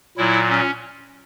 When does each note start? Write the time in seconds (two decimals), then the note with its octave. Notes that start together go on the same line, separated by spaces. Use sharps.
0.17 A#2 F#3 E4
0.49 C#4